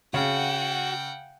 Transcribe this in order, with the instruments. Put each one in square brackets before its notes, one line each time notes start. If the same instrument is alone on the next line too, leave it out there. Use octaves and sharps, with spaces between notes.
[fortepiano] C#3 [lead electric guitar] F#4 [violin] F#5 G5